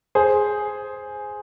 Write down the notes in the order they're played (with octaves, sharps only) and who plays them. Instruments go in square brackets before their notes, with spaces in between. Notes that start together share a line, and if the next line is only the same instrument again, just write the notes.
[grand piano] G#4 C5